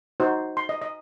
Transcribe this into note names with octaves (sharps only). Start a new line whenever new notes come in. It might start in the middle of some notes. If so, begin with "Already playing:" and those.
D#4 F#4 C5
C6
D#5
D#5